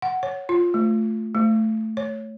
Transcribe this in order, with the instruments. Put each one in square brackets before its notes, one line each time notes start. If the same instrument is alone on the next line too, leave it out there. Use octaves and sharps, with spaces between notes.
[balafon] F#5
C#5
F4
A3
A3
C#5